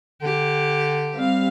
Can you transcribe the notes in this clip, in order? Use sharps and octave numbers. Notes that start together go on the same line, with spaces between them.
D3 G4
G3 C4 F5